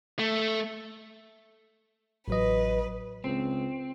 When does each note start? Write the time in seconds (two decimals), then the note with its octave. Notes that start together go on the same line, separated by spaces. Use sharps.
0.19 A3
2.28 A1 F#3 B4 D#5
3.24 C#2 C4